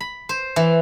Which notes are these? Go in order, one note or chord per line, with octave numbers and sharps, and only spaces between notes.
B5
C5
E3